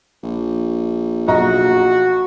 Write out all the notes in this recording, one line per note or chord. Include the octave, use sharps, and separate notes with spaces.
A#1
B1 F#4 D#5 A#5